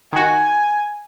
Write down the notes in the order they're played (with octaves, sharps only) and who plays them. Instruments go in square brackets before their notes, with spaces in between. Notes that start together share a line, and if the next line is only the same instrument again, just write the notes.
[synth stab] D#3 F#4 [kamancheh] G#5